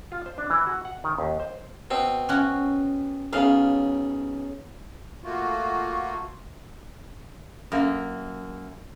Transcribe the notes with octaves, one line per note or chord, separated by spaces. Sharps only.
F4
C5
D4
E3
F#4
F#5
D#3
D#2
C5
B2 C4
C#4 F#4
B1 C#3 F5
A3 A#3 F4 F#4
F#2 A#3